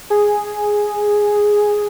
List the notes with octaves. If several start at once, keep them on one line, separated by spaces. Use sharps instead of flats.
G#4